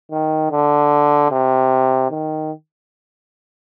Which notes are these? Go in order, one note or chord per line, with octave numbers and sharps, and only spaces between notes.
D#3
D3
C3
D#3